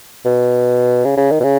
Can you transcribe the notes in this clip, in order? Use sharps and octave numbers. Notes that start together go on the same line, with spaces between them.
B2
C#3
C#3
D#3
B2
C#3